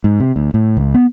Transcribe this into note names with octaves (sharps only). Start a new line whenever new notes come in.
G#2
C3
D2
A2
C#2
B3